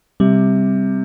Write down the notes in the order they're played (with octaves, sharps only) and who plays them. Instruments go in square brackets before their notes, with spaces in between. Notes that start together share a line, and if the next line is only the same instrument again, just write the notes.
[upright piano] C3 [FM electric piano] G3